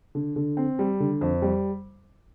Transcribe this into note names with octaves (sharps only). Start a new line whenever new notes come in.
D3
D3
C4
G3
D3
F2
G3